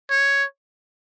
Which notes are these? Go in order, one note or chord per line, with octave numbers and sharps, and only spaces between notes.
C#5